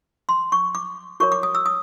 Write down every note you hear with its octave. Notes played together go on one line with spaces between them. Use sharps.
C6
C#6
D6
F#4 A#4 C#5 C#6
D6
D#6
E6
D#6